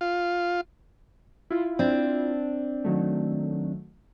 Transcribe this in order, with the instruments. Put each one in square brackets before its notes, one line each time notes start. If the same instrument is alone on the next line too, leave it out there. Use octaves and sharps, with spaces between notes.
[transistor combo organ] F4
[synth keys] E4 F4
[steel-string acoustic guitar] C4 D4
[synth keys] D#3 F#3 A3